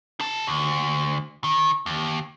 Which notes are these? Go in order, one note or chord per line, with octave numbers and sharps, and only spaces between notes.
G#4 A5
D2
D#3
D#2